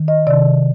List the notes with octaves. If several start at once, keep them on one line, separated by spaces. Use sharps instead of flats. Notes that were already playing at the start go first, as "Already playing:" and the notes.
Already playing: D#3
D#5
C3 D#3 D5